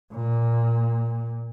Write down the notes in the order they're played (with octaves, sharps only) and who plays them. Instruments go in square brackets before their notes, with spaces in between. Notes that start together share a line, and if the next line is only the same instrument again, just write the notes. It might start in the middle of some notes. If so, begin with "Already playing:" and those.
[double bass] A#2